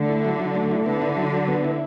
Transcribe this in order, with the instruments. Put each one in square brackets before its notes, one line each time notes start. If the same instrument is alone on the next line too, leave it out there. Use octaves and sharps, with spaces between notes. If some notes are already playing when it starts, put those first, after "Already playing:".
Already playing: [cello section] D3 [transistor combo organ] A3
[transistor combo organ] E4
F#3
F#3
A3
E4
[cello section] D3 [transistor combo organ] B3
[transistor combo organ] E4
F#3
F#3
B3
E4